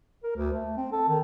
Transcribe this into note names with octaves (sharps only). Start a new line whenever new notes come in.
A#4
D2
A3
C4
A4
D#3